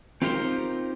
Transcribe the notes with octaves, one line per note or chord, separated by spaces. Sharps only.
C4 D#4 F4 G4 A#4 C5